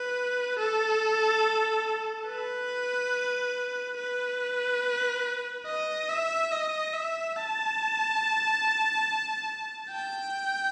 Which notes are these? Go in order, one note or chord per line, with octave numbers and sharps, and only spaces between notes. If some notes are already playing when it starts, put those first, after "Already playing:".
Already playing: B4
A4
B4
B4
D#5
E5
D#5
E5
A5
G5